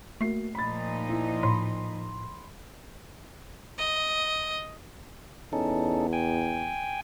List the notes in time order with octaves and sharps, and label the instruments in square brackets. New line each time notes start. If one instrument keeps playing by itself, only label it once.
[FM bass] A3 [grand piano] A#3 F#4 C7
[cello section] A#2 F3 D#4 [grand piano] B5 A6
[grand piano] E4
[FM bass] A2 [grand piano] B5 C6
[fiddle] D#5
[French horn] E2 [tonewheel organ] C#4 D#4 A4
[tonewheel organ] G5 G#5